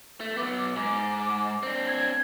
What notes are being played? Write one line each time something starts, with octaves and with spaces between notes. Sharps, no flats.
A3
F#3 B3 D6
G#2 D6
C4 D4
G#6